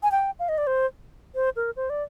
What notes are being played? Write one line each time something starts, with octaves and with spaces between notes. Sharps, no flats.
G#5
G5
F5
D#5
D5
C5
C5
A#4
C5
D5